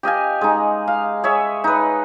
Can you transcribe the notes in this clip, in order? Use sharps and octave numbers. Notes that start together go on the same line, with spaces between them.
G4 D#5 F5 G#5
G#3 D#4
F5
G#4 C#5 E5
D#4 B4